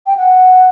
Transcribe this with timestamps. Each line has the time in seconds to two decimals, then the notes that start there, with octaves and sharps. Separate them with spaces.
0.06 G5
0.17 F#5